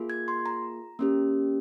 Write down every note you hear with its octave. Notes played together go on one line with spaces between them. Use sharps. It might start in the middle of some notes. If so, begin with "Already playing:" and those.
Already playing: A#3 F4 G#4
G#6
C6
A#5
A#3 C#4 G4